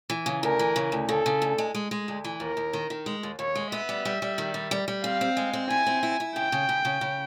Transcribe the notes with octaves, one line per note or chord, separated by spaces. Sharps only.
E3
C#3
D2 A#4
E3
C#3
D2
C#3 A4
C#3
D2
G#3
G#3
G#3
D2
E3
D#2 A#4
D#2
D#3
D#3
G#3
D#2
D#2 C#5
G#3
B3 E5
G3
G3
G3
D#3
G3
G3
G3
C4 F5
C4
G#3
C4
E4 G#5
C4
E4
E4
C#3 G5
C#3
C#3
C#3
C#3